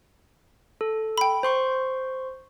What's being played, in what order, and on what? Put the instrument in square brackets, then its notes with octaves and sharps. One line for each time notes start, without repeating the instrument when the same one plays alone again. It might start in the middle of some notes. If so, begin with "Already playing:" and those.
[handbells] A4
[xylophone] G5 B5
[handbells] C5 C6 C#6